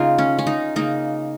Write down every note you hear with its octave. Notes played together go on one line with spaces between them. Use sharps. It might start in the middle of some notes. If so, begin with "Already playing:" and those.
Already playing: C#3 A#3 D#4 F4
C#4
C#4
D#4
C#3 A#3 D#4